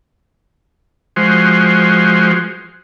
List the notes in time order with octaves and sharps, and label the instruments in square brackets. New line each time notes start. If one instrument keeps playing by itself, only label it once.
[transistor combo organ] F3 G#3 F#4 C5